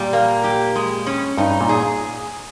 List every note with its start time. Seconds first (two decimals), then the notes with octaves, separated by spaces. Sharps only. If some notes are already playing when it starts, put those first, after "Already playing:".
Already playing: A#2 G3
0.13 A#3
0.44 G4
0.76 G#3
1.06 C#4
1.38 G2 D#4
1.61 A#2
1.69 G#4